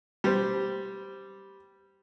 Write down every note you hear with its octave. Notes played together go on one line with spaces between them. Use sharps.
G3 C5